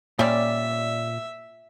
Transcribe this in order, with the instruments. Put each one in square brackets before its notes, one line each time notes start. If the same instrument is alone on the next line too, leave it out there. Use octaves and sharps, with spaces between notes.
[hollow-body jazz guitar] A#2 [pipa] G3 C#4 D5 [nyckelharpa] E5